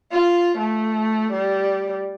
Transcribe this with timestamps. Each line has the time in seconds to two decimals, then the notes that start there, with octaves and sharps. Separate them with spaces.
0.12 F4
0.58 A3
1.32 G3